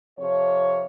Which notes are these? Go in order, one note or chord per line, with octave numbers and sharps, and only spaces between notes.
F2 C3 F3 C#5